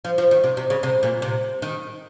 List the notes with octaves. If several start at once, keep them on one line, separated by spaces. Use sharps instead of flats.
F3
F3
D#3
C3
C3
C#3
C3
A#2
C3
D#3